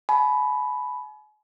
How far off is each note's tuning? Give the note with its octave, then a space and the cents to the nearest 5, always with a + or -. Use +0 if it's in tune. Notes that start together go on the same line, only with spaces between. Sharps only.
G#5 +40 B5 +0